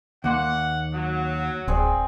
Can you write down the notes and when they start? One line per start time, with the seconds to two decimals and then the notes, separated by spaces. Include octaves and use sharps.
0.24 D#2 A#3 F#5 C6
0.94 F#3
1.68 D1 C4 G#4 D5